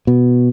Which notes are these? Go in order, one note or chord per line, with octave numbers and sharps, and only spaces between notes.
B2